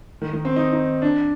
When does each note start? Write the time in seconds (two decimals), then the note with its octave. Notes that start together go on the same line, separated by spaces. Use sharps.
0.22 D#3
0.33 D#3
0.45 C4
0.56 D#4
0.73 D#4
1.02 D4